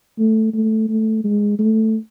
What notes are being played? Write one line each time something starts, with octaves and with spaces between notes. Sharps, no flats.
A3
A3
A3
G#3
A3